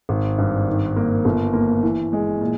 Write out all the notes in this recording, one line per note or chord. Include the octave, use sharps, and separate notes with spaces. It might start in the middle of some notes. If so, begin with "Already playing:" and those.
G#1
G2
D#3
A#3
G1
A#3
E3
G#3
A#2